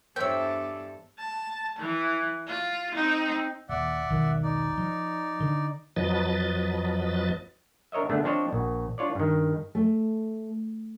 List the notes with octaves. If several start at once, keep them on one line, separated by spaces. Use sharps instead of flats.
E2 G2 A4 C5 C#5 E5 G5 E6
A5
E3
F4
C4 D#4
D#1 D5 E5 F#5
E1 B1 D#3
D#4 D5
F3
D3
F2 F3 F#3 B4 D#5 A6
D4 A#4 C#5 D#5 E5
D3 A3 B3 D4 G#4 A4
F3 C4 D4 C5 C#5 D#5
A#1 F#4
D4 F4 C#5 D5
G2 D#3
A3